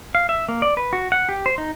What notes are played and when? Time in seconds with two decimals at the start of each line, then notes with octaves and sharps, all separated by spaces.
0.15 F5
0.29 E5
0.48 A#3
0.62 D5
0.77 B4
0.93 F#4
1.12 F#5
1.29 G4
1.46 C5
1.58 D#4